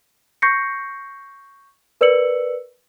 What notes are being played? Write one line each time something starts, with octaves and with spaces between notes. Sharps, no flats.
C#6 G6 A#6 C7 C#7
A#4 B4 D5 E6 C#7 F#7